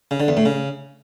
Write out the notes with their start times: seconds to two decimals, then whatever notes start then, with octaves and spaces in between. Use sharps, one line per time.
0.11 C#3
0.20 D3
0.28 E2
0.37 A2
0.46 C#3